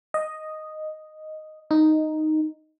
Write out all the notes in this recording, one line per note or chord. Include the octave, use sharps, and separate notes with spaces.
D#5
D#4